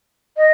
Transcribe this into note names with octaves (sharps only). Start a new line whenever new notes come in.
D#5